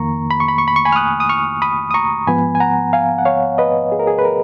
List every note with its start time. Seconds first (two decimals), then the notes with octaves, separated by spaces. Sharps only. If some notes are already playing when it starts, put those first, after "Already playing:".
Already playing: F2 D#3 A#3 A#5 C#6
0.31 B5
0.40 C#6
0.48 B5
0.58 C#6
0.68 B5
0.76 C#6
0.85 G#5 B5
0.93 F6
0.96 D#6 F#6
1.20 D#6
1.29 C#6 F6
1.62 B5 D#6
1.91 D#6
1.94 A#5 C#6
2.27 G#2 F3 B3 G#5 B5
2.55 G#5
2.60 F#5 A#5
2.93 F5 G#5
3.18 F#5
3.25 C#5 F5
3.58 B4 D#5
3.92 G#4
3.99 A#4
4.07 G#4
4.19 B4
4.25 A#4